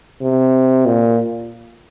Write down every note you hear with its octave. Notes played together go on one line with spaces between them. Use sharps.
C3
A#2